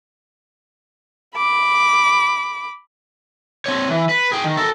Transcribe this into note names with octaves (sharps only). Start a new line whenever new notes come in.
B5 D6
C4 C#5
E3
B4
G#4 G5
D#3
A4 A#4